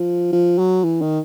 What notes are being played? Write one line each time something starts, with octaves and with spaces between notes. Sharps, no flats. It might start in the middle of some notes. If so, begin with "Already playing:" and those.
Already playing: F3
F3
F#3
E3
D#3